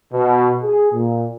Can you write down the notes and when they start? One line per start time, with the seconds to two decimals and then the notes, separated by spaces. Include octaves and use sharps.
0.13 B2
0.63 G#4
0.92 A#2